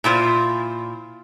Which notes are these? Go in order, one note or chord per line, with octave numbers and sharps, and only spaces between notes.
A#2 E4 F4 C5